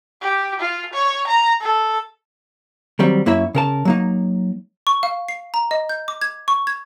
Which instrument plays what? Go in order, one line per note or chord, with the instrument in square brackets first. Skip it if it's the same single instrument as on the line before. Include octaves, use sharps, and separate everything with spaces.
[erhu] G4
F4
C#5
A#5
A4
[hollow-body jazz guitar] D#3 F#3 G3 C4
F#2 A#3 E4 C#5 E5
C#3 A#4 A5
F#3 A#3 D#4
[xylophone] C#6
F5
C7
A#5
D#5
G6
D6
G#6
C#6
G#6